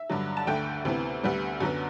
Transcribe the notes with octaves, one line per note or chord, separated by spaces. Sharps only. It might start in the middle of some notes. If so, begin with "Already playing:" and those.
Already playing: E5
G2 D3 F#3
A5
D2 D3 A3 G5
D2 C3 E3 B3
D2 D3 G3 B3
F#2 D3 F#3 B3